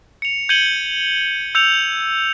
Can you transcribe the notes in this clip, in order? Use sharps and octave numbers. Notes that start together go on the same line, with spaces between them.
C#7 F7
G6 G#6 C#7 D#7 F#7 G7
E6 G6 C#7 F7